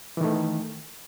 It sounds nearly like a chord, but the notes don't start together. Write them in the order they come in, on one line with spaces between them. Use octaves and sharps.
E3 D#3 A3